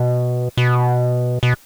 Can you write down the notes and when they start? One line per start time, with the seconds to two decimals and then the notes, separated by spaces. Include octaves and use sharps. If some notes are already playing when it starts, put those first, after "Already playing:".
Already playing: B2
0.57 B2
1.43 B2